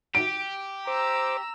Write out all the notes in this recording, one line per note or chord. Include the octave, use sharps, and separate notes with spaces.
G4 D7
C5 A#5 D6 E6